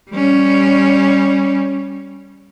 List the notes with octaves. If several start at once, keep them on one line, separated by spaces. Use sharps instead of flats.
G3 C#4